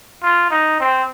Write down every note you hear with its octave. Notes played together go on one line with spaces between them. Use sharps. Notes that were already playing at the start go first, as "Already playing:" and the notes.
F4
D#4
C4